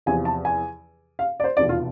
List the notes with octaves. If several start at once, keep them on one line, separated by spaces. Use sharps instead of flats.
E2 C3 F3 G#5
A5
G#5
F5
D5
C5
F1 E2 B2 D5
F4